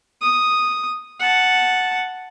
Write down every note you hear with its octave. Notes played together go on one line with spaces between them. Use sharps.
D#6
F#5 A5